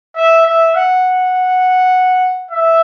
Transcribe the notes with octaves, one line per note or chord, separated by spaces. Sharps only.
E5
E5
F#5
E5